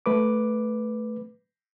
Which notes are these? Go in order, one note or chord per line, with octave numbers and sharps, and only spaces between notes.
A3 B4 D6